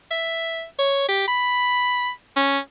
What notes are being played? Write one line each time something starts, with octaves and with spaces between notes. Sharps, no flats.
E5
C#5
G4
B5
C#4